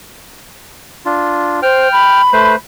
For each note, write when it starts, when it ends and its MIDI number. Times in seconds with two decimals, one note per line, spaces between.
1.06 1.60 62
1.06 1.60 65
1.62 1.88 72
1.62 2.22 79
1.62 2.22 89
1.92 2.53 83
2.33 2.56 57
2.33 2.56 71
2.33 2.56 72